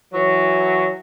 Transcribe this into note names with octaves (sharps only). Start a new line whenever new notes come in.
E3 F#3